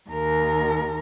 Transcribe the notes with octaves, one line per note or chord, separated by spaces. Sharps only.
D#2 A#4